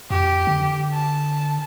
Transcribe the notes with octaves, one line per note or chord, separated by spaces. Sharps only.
F2 G4
D3
A5